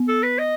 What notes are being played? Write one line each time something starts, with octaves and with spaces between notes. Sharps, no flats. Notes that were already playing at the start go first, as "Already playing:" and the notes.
Already playing: B3
A4
B4
D#5